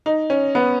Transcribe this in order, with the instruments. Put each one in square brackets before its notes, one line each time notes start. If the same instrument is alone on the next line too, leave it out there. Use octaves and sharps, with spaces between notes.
[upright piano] D#4
C#4
B3